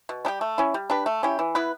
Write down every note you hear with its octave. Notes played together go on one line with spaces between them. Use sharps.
B2
G3 D4 G4
A3
C#4 E4
G3
D4 G4 B4
A3
C#4 E4 G4
E3
B3 E4 B4